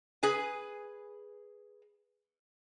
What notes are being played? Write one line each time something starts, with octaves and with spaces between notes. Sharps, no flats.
G#4 B4 G#5